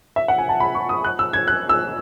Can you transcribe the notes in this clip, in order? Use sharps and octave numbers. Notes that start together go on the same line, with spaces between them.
E5
F#5
G#5
A5
B5
C#6
D#6
F#6
E6
G#6
F#6
E6